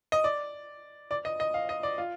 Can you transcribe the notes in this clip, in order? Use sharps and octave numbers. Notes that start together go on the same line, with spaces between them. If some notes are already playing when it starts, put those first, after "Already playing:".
D#5
D5
D5
D#5
D#5
F5
D#5
D5
F4